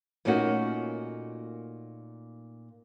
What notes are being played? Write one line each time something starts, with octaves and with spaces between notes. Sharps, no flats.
A#2 A3 A#3 C#4 D#4 F#4